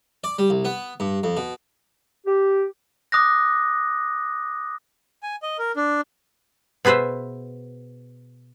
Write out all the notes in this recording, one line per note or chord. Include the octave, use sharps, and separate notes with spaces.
D5
G3
C2
B3
G2
F2
B2
G4
D6 D#6 F#6 A#6
G#5
D#5
A#4
D4
B2 G#4 B4 C5 E5